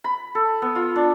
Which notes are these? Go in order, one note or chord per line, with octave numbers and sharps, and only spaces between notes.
B5
A4
B3
F4
D4